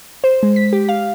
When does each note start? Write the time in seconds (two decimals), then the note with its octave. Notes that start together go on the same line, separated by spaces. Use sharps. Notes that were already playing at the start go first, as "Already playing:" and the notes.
0.24 C5
0.43 G#3
0.56 B6
0.73 G4
0.89 F5